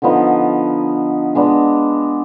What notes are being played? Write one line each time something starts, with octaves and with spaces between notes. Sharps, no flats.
D3 F3 B3 D#4
G#3 B3 D4